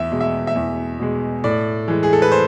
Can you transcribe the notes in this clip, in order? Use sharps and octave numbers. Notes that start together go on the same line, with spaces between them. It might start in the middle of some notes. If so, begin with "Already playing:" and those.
Already playing: E2 E5
B2 G#3
E5
E5
E2
B2 G#3
A2 D5
E3 G#3
G#4
A4
B4
C5